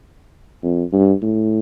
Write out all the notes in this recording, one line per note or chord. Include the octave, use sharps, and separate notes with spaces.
F2
G2
A2